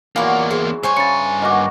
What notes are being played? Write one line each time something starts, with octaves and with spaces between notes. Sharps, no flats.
E2 E3 F#3 A#3 F4 D5
G#4 C5
G2 C5 C#5 G#5 C#6
C#3 A6 C#7
A#3 F#4 D#5 D6